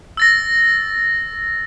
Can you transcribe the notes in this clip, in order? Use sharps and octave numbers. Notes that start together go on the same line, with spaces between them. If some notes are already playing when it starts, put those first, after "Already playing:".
E6 A6 A#6